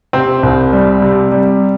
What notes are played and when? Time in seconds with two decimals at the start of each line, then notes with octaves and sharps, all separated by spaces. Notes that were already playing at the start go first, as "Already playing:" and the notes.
0.13 C3 C4
0.43 C2
0.73 G3
1.02 C3
1.32 G3